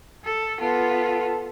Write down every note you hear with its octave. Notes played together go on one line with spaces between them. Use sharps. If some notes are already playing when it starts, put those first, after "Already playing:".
A4
B3 F4 A4